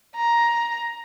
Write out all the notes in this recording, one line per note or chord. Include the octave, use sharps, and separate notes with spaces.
A#5